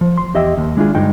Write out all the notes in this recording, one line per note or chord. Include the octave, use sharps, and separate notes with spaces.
F3
C6
E2 G4 D#5 E5 G5
D#2
G#3 D4 E4 F4 G#4
D2 G2 G#3 D#4 G5